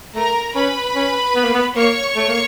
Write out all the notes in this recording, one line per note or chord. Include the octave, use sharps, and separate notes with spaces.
A3 A#4 A#5
C#4 B4 B5
C#4
B3
A#3
B3
A#3 C#5 C#6
A3
A#3